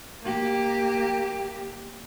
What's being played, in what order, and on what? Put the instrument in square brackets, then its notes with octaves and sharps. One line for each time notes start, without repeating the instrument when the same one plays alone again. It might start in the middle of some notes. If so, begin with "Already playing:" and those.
[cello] A#3 G4